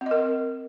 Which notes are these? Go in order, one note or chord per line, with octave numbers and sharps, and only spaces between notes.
C4
D#5
A#4